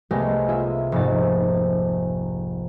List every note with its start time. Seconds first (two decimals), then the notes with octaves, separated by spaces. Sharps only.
0.11 C2 G#3 A3 B3 G4 C#5
0.48 F4 G#4 E5
0.92 F1 G#2 C3 A#3 A6